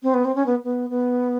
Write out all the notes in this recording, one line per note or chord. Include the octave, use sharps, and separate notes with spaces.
C4
B3
C4
C#4
B3
B3
B3